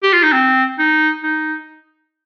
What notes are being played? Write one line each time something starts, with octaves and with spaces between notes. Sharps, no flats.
G4
F4
D#4
C4
D#4
D#4